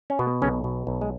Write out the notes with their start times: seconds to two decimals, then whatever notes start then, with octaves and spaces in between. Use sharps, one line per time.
0.10 C#4
0.19 B2 B3
0.42 B1 C#3 C#4
0.64 B2
0.87 B1
1.01 G#3